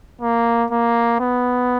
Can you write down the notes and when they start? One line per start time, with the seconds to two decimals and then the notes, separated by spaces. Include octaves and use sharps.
0.21 A#3
0.71 A#3
1.20 B3